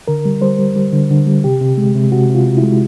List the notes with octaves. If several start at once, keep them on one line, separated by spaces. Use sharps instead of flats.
D3 A#4
G3
G3 C5
G3
G3
D3
D3
G3
C3 G4
C3
G#3
C3
C3 F#4
C3
F4
C3
E4
G#3